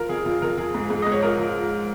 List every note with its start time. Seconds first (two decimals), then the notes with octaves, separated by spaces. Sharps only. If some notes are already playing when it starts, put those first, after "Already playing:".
Already playing: F3 A#4
0.09 F2 G#4
0.25 F2 F4
0.42 F2 A#4
0.58 F3 G#4
0.74 G#2
0.90 G#2
1.02 G#2 D#5
1.12 C#5
1.23 F3 A#4
1.38 F3
1.55 F3